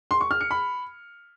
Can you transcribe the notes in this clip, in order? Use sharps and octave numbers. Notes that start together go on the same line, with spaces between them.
C6
C#6
F6
C#7
B5